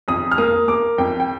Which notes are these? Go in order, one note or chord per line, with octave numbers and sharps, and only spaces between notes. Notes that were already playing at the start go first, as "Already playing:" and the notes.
F2 D#6
F6
A#3 D#6
A#3 D6
F2 G5
G5